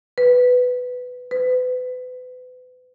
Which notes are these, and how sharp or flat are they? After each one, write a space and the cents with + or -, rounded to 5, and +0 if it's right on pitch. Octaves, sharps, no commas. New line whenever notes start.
B4 +10
B4 +35